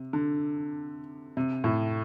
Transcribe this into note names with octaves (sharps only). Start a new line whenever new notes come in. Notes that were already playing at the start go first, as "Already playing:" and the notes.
Already playing: C3
D3
C3
A2